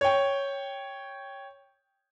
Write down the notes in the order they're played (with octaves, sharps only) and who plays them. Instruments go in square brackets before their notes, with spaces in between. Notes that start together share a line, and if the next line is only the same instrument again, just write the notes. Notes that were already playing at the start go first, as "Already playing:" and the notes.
[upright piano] C#5 G5